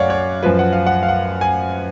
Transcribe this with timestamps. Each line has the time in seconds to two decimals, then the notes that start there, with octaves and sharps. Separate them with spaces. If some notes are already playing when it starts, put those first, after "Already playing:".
Already playing: F#2 C#5 D5 F5 F#5
0.10 C#5
0.43 F#2 F3 B4
0.59 F#5
0.73 F5
0.86 F#5
1.03 F5
1.08 F#5
1.41 G#5